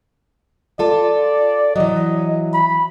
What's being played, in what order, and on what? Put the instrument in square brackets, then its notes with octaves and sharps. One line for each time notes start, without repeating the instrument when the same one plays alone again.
[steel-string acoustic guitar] F4 A4 [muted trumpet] D5
[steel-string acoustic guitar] E3 F#3 [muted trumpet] D#5
[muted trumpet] B5